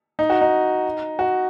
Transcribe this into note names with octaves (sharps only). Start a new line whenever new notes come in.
D#4
F#4
D#4
F#4